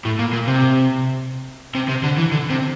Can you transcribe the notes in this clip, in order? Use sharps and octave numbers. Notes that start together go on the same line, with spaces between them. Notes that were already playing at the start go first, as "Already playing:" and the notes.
A2
A#2
A#2
C3
C3
C3
D3
E3
D3
C3